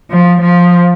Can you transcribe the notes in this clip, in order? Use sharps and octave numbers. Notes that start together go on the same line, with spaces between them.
F3
F3